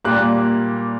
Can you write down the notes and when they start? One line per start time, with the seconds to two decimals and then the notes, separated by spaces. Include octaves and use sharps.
0.04 A#2 G3 A#3 F#6